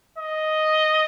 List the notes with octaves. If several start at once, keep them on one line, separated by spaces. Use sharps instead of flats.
D#5